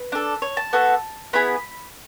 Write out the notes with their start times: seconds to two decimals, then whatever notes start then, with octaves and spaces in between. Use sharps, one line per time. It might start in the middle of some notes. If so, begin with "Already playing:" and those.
Already playing: B4
0.12 D4 A4
0.42 C#5
0.57 A5
0.73 B3 F#4 A4
1.33 B3 E4 G#4 B5